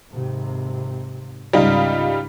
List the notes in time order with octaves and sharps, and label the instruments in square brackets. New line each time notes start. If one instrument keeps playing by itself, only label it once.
[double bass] G#1 C3
[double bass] C#2 G#2 [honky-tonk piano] G3 D#4 F4